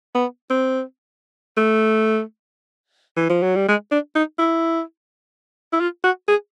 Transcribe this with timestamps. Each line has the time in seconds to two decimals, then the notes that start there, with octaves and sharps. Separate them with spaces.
0.15 B3
0.50 C4
1.57 A3
3.16 E3
3.29 F3
3.43 F#3
3.55 G3
3.68 G#3
3.91 D4
4.15 D#4
4.39 E4
5.73 E4
5.80 F4
6.04 F#4
6.28 G#4